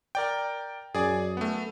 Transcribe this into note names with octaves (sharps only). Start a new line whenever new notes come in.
A#4 D5 G5
F#2 G#4 D5 G#5
A3 B3